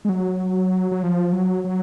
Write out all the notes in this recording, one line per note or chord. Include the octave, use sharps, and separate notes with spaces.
G#3
F#3
F#3
F3
F#3
F#3